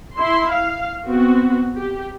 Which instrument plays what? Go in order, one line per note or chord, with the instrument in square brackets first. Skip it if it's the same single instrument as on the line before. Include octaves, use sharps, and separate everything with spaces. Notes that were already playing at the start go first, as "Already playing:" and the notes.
[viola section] E4 C6
F5
B3 C4 F#4
G4